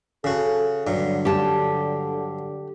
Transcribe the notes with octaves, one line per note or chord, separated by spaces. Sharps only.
C#3 F#4 A4
G2 D3 F#3
G4 A5